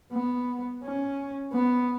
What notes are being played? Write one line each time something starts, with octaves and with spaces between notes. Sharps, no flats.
B3
C#4
B3